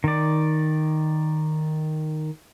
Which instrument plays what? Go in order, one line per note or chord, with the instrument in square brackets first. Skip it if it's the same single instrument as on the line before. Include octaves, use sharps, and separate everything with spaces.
[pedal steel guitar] D#3 D5